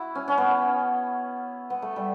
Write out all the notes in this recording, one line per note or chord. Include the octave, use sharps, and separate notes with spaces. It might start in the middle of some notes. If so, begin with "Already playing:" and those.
Already playing: E4 F#4
C#4
C#4
B3
B3
A3
G3